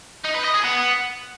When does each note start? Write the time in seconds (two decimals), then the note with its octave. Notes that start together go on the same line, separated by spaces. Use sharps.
0.24 D#4
0.34 B4
0.44 D#5
0.54 G#4
0.64 B3